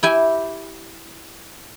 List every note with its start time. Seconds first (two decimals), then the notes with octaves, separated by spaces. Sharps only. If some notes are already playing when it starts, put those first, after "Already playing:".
0.03 E4 G4 G#5